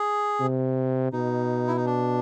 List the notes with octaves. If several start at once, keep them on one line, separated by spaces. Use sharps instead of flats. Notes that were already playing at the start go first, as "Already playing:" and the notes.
Already playing: G#4
C3
B2 D#4
E4
D#4
D4